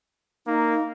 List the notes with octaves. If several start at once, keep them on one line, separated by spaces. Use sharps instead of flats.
A#3 D#4